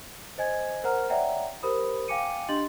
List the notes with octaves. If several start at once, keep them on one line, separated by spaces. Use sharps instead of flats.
C5 D#5 G#5 G#6
A#4 C5 F#5 A#5 F6
C#5 D5 E5 F#5 G5 A#5
G4 A#4 C5 B5 D#6
F5 G5 G#5 D6 C#7 D#7
D4 G4 D#5 C6 A6 F#7